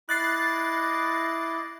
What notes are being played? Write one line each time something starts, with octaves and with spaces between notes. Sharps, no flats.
E4 D#5 D6 F#6 A6 C7